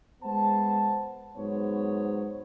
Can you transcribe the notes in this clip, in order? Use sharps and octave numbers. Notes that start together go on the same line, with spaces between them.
G#3 B3 C5 A5
G#2 F#3 B3 C5 C#5